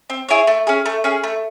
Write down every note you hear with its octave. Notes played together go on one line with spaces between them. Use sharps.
C4
E4 G#4 C#5
A3
C#4 G#4
A3
C#4 G#4
A3